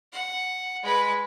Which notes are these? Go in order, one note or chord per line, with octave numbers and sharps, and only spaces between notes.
F#5
G#3 B4